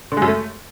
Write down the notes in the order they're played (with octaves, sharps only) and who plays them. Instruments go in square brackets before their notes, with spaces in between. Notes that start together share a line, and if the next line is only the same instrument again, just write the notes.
[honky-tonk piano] D3
G#3
F#2
A3